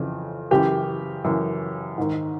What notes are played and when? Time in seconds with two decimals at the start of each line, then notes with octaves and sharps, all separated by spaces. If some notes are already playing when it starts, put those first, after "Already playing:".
Already playing: F2 C#3 E3
0.51 F#2 C#3 E3 G4
1.24 F#2 C#3 E3
1.98 G#2 D#3